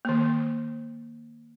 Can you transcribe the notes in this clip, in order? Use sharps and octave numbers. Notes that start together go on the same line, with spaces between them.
D#3 A#3